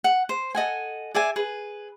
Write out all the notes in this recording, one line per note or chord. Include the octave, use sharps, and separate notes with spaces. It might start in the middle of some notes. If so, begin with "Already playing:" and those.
F#5
C5
A4 D#5 F#5 G#5
G#4 D5 E5 G#5
G#4 B4